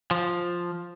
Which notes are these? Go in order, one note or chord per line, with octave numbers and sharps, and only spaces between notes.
F3